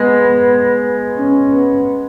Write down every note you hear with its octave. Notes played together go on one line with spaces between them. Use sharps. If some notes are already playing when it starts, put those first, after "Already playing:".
Already playing: G#3 B3
C#4
B3